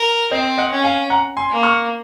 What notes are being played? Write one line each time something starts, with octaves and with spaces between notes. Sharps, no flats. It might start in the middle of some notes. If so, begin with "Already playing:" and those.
Already playing: A#4
C4 C5 D#5
D#5 F#5
C#4
F5 G#5
F#5 A#5
G#5 C6
A#3
C#6 F6